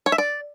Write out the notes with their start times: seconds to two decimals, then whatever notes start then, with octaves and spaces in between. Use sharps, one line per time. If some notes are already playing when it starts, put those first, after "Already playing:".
0.06 C#5
0.12 E5
0.18 D5